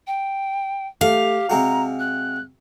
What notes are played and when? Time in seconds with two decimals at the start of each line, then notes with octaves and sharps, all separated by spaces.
0.07 G5
1.01 A3 G4 F5
1.50 C3 G#3 F#4 A#5
2.00 F#6